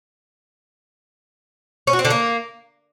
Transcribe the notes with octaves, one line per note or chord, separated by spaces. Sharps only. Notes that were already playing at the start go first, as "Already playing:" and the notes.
C#4
F#4
C4
D3
A#3